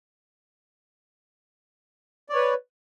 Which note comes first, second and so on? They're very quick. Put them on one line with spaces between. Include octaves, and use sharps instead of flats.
D5 C#5 B4